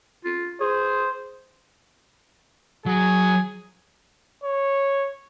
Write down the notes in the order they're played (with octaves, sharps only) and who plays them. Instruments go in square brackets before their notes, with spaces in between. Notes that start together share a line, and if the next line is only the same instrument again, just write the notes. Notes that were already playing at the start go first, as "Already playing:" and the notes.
[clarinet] F4
[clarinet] G#4 [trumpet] C5
[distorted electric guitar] F#3 [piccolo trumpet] G#4
[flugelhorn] C#5